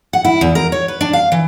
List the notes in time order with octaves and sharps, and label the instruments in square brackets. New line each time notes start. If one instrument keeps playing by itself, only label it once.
[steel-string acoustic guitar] F#5
E4
E2
A#4
C#5
B4
D4
F5
E3